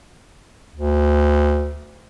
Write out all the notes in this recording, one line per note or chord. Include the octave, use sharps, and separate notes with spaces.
D2